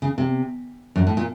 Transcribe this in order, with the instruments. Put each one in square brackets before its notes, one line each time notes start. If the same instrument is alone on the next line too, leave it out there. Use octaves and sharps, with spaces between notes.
[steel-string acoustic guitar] C#3
C3
F#2
A2
A#2